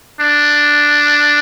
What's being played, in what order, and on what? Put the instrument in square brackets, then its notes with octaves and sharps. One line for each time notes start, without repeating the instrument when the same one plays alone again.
[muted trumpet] D4